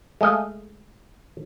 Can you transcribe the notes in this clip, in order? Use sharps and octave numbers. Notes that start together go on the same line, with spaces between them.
G#3 A3 D#5 F5